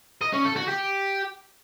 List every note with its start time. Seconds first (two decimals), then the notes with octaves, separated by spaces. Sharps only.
0.22 D#5
0.33 C#4
0.45 A4
0.56 F#4
0.67 G4